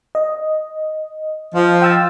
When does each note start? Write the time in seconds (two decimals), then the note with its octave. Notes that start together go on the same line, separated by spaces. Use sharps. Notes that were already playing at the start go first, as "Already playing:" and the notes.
0.15 D#5
1.55 F3
1.82 G5 E6 A6